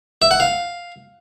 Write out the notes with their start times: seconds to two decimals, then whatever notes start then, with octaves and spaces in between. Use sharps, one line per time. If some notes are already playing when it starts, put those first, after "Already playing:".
0.22 E5
0.31 F#5
0.40 F5